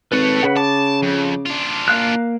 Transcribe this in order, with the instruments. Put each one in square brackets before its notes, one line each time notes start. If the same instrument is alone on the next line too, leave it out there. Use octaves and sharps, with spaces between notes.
[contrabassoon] G#1 [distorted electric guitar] A4 C#5 [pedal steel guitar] B4
[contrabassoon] C#3 [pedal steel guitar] B4 F#5
[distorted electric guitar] A5 [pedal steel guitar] D6
[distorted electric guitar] F2
D4 F4
[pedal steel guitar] A#3 F5 F#6